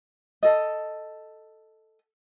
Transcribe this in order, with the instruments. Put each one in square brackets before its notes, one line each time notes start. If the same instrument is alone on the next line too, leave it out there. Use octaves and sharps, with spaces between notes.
[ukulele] A4 D#5